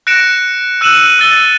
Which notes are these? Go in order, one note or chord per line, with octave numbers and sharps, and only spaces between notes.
F#6 A#6 C#7 D7 E7
E6 F#6 D#7 E7 F#7
E6 F#6 A6 G7